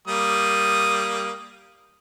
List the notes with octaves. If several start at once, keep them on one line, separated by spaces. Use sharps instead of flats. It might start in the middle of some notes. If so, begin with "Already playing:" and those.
G3 A#3 D#6